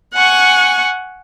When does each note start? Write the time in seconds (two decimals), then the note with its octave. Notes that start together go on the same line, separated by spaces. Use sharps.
0.14 F#5 G#5 C#6